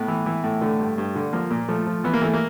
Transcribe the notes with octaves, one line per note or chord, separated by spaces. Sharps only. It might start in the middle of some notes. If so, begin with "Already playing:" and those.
Already playing: A2 B3
E3
E3
A2
D3 A3
G2
G2
D3
F3 A#3
A#2
F3 A3
F3
E3 B3
A#3
E3 A3
A#3